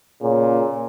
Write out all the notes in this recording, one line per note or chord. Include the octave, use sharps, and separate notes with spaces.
A#2 C#3